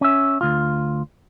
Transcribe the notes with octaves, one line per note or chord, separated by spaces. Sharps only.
C#4 E5
D2 F4